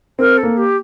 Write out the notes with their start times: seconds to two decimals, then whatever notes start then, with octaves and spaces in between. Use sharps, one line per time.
0.18 C4 A#4
0.37 A4
0.43 A#3
0.57 G4